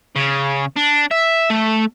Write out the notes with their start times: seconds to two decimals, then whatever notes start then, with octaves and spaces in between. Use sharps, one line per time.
0.16 C#3
0.76 D4
1.11 E5
1.50 A3